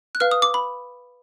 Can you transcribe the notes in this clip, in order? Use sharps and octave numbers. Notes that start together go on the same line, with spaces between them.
F#6
B4 F5 F6
D#6
D6
B5